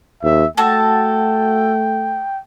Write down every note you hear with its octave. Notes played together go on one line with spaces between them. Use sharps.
D#2 E5
A3 F#4 A4 G5 A5